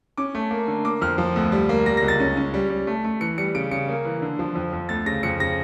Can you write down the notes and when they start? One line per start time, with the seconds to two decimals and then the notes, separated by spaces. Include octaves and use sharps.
0.17 C#4 D6
0.35 A3
0.51 A#3
0.68 D3
0.85 A#3 D6
1.01 F2 F6
1.18 F3
1.36 D2
1.52 G3
1.69 A#3
1.86 G3 A#6
1.97 A#6
2.03 C#2
2.08 A6
2.20 C#4
2.37 C#4
2.54 G3
2.70 G3
2.87 A3
3.04 A3
3.21 E3 C#7
3.38 G3 C#7
3.55 C#3 D7
3.71 C#3 C#7
3.88 A#3
4.05 E3
4.22 D3
4.39 F3
4.55 F2
4.73 F2
4.89 D2 A6
5.06 C#3 A#6
5.23 F2 C#7
5.40 C#3 A#6